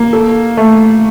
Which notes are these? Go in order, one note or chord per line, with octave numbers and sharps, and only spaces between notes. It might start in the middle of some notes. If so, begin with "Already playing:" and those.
Already playing: A#3
A4
A3